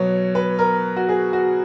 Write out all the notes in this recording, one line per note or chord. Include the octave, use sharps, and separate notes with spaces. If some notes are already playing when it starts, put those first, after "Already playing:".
Already playing: B2 F#3 B3 C#5
B4
A#4
F#4
G#4
F#4